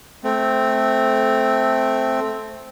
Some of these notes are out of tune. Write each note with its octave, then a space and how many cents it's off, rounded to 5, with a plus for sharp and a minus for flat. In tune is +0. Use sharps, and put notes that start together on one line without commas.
A3 -10 C4 +0